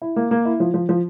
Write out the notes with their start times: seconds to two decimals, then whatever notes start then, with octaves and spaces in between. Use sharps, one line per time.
0.02 E4
0.16 A#3
0.31 A#3
0.45 E4
0.60 F3
0.74 F3
0.89 F3